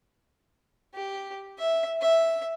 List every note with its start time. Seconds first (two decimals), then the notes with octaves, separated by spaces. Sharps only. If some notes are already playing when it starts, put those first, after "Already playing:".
0.94 G4
1.59 E5
2.01 E5